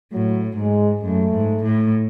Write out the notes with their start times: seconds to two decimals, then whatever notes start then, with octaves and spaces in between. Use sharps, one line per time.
0.13 A2 F#3
0.57 G#2 G#3
1.03 F#2 A3
1.33 G#2
1.63 A2